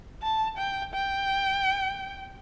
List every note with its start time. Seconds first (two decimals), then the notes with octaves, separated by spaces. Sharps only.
0.23 A5
0.58 G5
0.94 G5